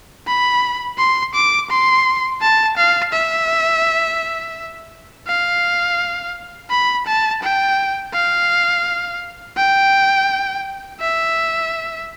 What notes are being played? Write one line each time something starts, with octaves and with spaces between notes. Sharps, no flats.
B5
C6
D6
C6
A5
F5
E5
F5
B5
A5
G5
F5
G5
E5